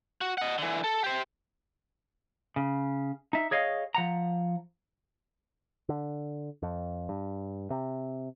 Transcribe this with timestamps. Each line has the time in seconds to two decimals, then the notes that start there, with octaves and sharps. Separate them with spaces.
0.21 F#4
0.38 D#5 F#5
0.58 D3 E3
0.84 A4
1.04 G4 C5
2.56 C#3
3.33 D#4 E5
3.51 G#4 C#5 D#5 F5
3.95 F3 F#5 A#5
5.89 D3
6.62 F2
7.09 G2
7.70 C3